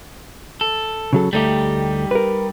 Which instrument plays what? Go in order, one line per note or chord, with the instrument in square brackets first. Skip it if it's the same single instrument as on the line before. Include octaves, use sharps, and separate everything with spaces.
[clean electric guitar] A4
[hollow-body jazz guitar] C#3 F#3 A4
[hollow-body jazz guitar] D2 A3 [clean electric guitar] G3 D#4 G4
[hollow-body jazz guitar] A#4 B4